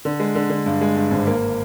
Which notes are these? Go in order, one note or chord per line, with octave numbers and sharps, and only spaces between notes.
D3
G#3
D3
D3
G2
G#3
G2
G#1
A#3